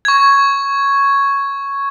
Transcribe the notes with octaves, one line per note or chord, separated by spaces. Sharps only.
C#6 G#6